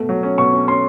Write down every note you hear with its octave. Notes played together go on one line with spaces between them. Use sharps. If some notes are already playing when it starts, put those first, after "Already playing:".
Already playing: B2 A3
F#3
C#4
B2 C#6
C#4
C#4 C6